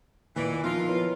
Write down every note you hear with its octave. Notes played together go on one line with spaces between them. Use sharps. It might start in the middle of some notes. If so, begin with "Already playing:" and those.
D#2 A#2 E3 D5
F3 B3 D#4 F4 A#4 F5 E6
E4 B4 C#5